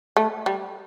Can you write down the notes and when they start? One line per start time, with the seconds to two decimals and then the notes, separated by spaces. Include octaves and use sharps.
0.17 A3
0.46 G3